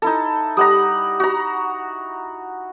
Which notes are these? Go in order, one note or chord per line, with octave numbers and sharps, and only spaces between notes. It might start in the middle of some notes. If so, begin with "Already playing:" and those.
D#4 E4 A4
G3 F#5 A#5 D#6
F#4 A#5